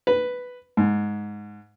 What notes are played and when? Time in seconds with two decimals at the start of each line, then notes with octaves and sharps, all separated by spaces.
0.07 B4
0.77 G#2